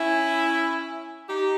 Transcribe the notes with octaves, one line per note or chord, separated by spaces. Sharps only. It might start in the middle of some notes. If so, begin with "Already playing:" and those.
Already playing: C#4 E4
D#4 G4